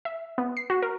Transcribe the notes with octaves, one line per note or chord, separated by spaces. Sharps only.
E5
B3
C7
F#4
A#4